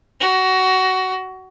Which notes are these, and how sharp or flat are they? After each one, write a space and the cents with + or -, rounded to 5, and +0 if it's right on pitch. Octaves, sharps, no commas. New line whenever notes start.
F#4 +20